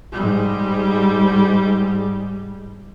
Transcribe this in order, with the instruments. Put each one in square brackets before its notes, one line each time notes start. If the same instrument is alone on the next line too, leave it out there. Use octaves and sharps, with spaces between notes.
[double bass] G#2 G3